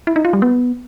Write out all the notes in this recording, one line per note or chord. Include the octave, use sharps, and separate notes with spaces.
E4
D#4
F4
G3
B3